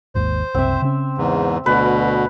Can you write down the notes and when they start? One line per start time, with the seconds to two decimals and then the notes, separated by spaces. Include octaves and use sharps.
0.15 G#1 D#2 G#2 C5
0.55 F#1 C2 C4 E5
0.82 C#3 C#4
1.18 E2 G#2
1.66 D2 B2 B4